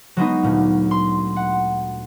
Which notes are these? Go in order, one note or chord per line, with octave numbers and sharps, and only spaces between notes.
F#3 G#3 B3 D#4
D2 A#2
C6
F#5